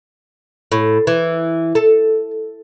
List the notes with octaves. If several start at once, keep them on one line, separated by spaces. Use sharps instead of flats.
A2
E3
A4